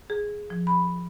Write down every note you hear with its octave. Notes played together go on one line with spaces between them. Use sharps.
G#4
F3
B5